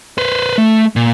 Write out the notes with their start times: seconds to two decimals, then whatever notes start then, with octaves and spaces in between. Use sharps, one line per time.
0.18 B4 C5
0.58 A3
0.96 A#2